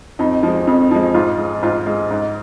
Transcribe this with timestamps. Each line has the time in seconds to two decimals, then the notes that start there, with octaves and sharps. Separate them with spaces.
0.19 F2 D#4
0.43 F3 G#3
0.67 F2
0.91 F3 G#3
1.14 G#2 F4
1.38 G#3
1.63 G#2 F4
1.86 G#3
2.11 G#2